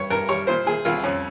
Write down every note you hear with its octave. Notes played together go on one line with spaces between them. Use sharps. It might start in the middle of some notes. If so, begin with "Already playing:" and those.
Already playing: G2 C#5
G2 A#4
G3 C#5
A#2 C5
A#2 G#4
C2 F4
F2 C#4